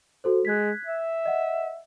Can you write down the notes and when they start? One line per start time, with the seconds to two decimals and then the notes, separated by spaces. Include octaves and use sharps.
0.24 F#4 A4 C5
0.45 G#3 F#6 G#6 B6
0.87 E5
1.26 D#5 F#5